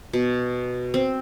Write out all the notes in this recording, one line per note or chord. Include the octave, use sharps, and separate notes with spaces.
B2
C4